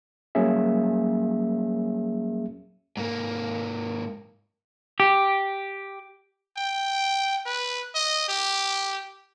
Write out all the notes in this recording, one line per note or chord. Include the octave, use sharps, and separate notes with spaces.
F#3 G3 A#3 C#4 G#4 E5
G#2 A#3
G4
G5
B4
D#5
G4